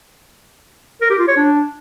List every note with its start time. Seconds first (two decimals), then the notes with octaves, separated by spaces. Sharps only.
1.02 A#4
1.10 G4
1.19 F4
1.28 C#5
1.37 D4